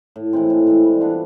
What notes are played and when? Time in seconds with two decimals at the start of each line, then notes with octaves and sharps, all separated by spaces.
0.16 A2
0.33 E3 G#3 C4
0.50 A2
0.67 E3 G#3 C4
0.83 G3
1.01 B3 D4 F4